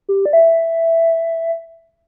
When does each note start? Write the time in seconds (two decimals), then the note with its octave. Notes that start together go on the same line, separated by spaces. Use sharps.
0.09 G4
0.26 D5
0.33 E5